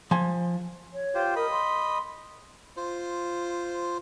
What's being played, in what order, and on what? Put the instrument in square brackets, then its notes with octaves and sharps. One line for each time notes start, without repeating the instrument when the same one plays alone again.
[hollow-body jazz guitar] F3 G#5
[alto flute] C#5
[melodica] F4 G4 C5
[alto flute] A#4 [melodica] D#5 B5
[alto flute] C6
[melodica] F4 C5